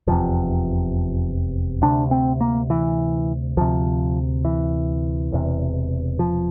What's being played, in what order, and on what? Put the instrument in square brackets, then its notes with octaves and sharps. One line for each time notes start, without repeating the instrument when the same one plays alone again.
[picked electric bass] F1 E2 C3 F3
D2 C3 D4
C4
A#3
E3
D2 C3 F3
E3
E1 E2 C3
F3